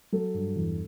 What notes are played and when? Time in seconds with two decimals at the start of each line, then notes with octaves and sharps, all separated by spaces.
0.12 F#3 A4
0.34 G2
0.56 E2